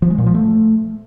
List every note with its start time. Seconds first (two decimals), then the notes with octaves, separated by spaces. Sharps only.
0.02 F3
0.10 G#3
0.18 A#2
0.26 F3
0.34 A3